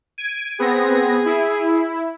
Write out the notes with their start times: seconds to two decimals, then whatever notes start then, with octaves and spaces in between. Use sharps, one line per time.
0.18 G#6 D7 D#7
0.59 B3 C4 G#4 A#6
1.25 E4